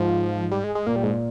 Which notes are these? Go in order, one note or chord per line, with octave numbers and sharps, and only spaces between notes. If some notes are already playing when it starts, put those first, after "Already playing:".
Already playing: G#2 F3
G3
G#3
G#3
A#2 A#3
G3
G#2